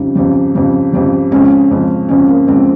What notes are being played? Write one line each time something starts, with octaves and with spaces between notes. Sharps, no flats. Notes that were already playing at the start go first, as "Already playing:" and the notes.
Already playing: F2 C#3 G3 D#4
F2 C#3 G3
F2 C#3 G3
F2 C#3 G3
F2 C#3 G#3 C#4
F2 C#3 G#3
F2 C#3 G#3 C#4
A#3
F2 C#3 G#3 C4